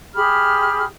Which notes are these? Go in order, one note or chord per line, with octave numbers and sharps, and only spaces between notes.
G4 G#4 B5 F6